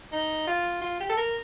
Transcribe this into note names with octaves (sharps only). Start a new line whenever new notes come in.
D#4
F4
F4
G4
A4
A#4